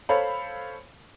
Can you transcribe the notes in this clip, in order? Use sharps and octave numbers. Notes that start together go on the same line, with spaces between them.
A4 C5 C#5 F5 B5